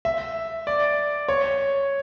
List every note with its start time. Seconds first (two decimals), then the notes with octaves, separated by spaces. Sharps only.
0.05 E5
0.67 D5
1.28 C#5